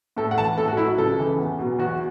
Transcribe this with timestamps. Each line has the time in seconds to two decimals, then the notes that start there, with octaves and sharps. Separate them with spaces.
0.16 A2 A4
0.31 F#5
0.38 E3 A5
0.57 A2 A4
0.68 F#4
0.77 F#3 E4
0.98 C#2 A4
1.18 C#3 E3
1.38 E2
1.59 B2 F#3
1.78 E2 F#4